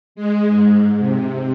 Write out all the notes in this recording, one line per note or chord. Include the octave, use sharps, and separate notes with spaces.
G#3
G#2
C3